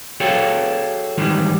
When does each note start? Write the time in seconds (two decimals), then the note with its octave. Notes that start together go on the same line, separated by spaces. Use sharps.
0.20 F#4 G#4 A4 C#5 F5 G5
1.18 G#2 D#3 E3 G3 G#3